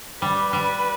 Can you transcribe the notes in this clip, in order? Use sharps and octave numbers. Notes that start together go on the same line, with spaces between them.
G3 B4
G3